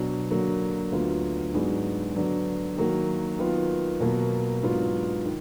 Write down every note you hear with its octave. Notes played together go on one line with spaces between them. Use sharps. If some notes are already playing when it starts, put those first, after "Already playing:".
Already playing: B2 F#3 D4
D3 F#3 A#3
D2 D3 F#3 B3 F4
G#2 F#3 B3 D4 G#4
D3 F#3 B3 D4
D#3 F#3 A#3
D#3 F#3 B3 F4
B2 F#3 A#3
G#2 F#3 B3 D4 F4
D#3